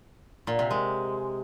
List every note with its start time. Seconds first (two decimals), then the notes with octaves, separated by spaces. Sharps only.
0.47 A#2
0.59 C3
0.71 G#3